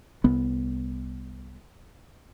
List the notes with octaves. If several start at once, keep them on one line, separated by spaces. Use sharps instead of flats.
C2 B3